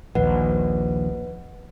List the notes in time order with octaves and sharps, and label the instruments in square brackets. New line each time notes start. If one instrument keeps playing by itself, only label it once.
[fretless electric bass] A#1 D#2 A#2 [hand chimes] B4 D#5 F#5